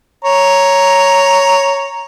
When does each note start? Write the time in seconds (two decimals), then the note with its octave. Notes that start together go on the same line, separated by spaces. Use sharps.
0.25 C#5 A#5